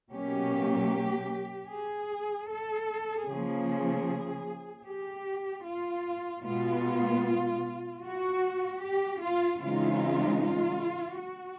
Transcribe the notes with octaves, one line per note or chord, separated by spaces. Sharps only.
B2 F#3 A#3 C#4 G4
G#4
A4
C#3 F3 A#3 G#4
G4
F4
B2 G#3 B3 F4
F#4
G4
F4
C#3 E3 G#3 C4 D#4 F4
F4
F#4